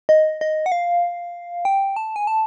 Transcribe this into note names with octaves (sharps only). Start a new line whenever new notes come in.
D#5
D#5
F#5
F5
G5
A5
G#5
A5